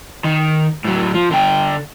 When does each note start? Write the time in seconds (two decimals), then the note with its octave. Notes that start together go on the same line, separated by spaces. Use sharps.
0.24 D#3
0.84 A2 F#3
1.14 F3
1.31 D3 G5